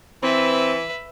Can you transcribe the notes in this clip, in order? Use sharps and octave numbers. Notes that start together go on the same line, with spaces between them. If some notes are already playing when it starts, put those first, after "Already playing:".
E3 C4 B4 E5